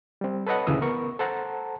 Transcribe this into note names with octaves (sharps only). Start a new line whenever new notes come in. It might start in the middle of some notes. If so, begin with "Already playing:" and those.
G3 C4
A4 B4 C#5 D#5 F#5
D2 A#2 C#3 E3 D#6 E6
B3 A#4 C#6
A4 C5 F#5 A5 A#5